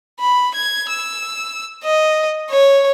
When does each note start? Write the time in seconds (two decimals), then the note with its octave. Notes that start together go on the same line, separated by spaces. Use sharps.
0.20 B5
0.55 G#6
0.90 E6
1.84 D#5
2.50 C#5